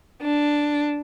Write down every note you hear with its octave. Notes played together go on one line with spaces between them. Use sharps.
D4